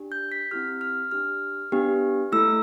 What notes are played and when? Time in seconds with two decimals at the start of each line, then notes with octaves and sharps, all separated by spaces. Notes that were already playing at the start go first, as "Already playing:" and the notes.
Already playing: D4 G4
0.12 G6
0.32 B6
0.51 C4 E4 G4 F6
0.81 F6
1.11 D4 G4 F6
1.72 B3 D4 G4
2.32 A3 E4 A4 E6